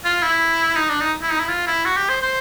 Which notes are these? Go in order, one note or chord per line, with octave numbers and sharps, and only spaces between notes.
F4
E4
D#4
D4
D#4
E4
D#4
E4
F4
E4
F#4
G4
C5
C5